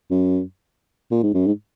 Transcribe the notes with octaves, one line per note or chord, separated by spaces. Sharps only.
F#2
A#2
G#2
F#2
G#2